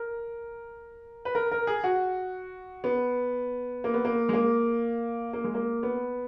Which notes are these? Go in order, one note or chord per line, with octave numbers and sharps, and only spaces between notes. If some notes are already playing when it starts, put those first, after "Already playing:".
Already playing: A#4
B4
A#4
A#4
G#4
F#4
B3
A#3
B3
A#3
G#3
A#3
A#3
G#3
A#3
B3